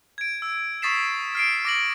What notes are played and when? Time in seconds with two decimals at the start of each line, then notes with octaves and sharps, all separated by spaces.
0.18 G#6 D7
0.42 E6
0.82 C#6 D#6 A6 B6 C7 E7
1.35 F6 C7 D7
1.65 D6 A#6 F#7